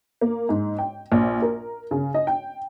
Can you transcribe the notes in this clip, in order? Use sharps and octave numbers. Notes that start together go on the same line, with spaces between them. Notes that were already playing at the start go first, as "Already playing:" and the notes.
A#3
G#2
G5
A#1
A#4
C#3
D#5
G5